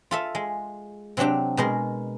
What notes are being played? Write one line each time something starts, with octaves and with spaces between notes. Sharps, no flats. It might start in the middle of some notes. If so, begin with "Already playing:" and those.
F4 A4 E5
G#3
C3 F#3 C4 D4 G4
B2 G#3 A#4